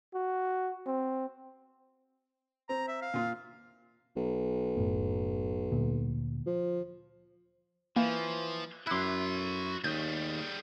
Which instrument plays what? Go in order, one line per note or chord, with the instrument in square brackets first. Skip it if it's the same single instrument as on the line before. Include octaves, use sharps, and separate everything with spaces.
[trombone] F#4
C4
[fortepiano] C4 [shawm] A#5
[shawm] E5
F5
[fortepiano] A#2 F4
[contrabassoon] B1
[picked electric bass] F#1 A2
D2 A#2
[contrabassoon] F3
[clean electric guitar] E3 [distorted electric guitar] F3 [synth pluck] A#3
[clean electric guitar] F#2 E4 [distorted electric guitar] F#4 C6 [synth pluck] D6 F#6
[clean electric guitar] D#2 [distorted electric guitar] G3 G#4 [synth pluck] G6